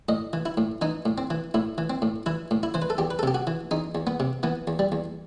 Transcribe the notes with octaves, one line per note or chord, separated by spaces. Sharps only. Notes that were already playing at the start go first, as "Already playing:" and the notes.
A2 D#5
E3
E4
A2
E3 D#4
A2
C4
E3
A2 E4
E3
C4
A2
E3 E4
A2
E4
E3 C5
B4
A4
E2 G4
B4
A4
C3 G4
F#4
E3
E2 D#4
E2
B3
C3
E3 B3
E2
G3
E2